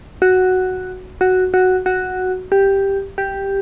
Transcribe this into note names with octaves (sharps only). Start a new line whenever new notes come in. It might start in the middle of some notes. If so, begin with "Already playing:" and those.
F#4
F#4
F#4
F#4
G4
G4